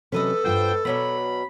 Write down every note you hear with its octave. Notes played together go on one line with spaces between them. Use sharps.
C3 F#3 B3 C#4 A4 B4 D#5
G2 F4 C5 F#5 G5
B2 F#3 B3 D4 B5